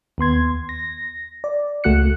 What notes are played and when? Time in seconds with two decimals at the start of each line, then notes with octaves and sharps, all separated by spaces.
0.18 D#2 B3 C6 G#6
0.69 A#6
1.44 D5
1.84 C#2 A3 F#4 F#6 C#7